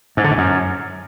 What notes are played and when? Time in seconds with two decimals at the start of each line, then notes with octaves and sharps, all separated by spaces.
0.17 G#2
0.24 D3
0.31 G#2
0.38 F#2